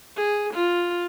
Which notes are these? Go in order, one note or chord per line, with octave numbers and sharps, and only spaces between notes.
G#4
F4